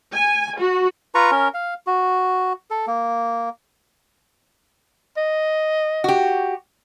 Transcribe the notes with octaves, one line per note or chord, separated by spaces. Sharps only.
G#5
F#4
F4 B4 A#5 C#6
C#4 A#4
F5
F#4
A4
A#3
D#5
F#4 G4